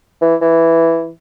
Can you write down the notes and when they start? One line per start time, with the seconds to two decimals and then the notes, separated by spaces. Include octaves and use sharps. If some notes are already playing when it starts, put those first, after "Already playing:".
0.21 E3
0.41 E3